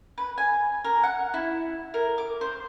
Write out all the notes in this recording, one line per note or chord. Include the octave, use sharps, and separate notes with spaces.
B4
G#5
A#4
F#5
E4
A#4
D6
C5